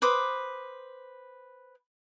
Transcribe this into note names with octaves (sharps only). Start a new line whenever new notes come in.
B4 C5 D6 D#6